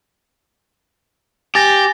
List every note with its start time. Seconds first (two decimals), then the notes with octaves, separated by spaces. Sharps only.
1.55 G4 G#5 A6 A#6